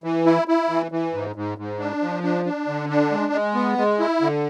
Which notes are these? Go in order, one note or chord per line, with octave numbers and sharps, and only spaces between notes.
E3
E4
E4
E3
E3
G#2
G#2
G#2
D4
F3
D4
D4
D3
D4
G#3
G#3
B3
G#3
E4
D3